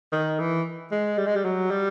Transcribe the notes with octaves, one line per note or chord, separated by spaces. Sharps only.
D#3
E3
G#3
G3
G#3
G3
F#3
G3